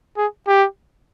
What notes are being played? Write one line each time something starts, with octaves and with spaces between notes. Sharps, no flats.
G#4
G4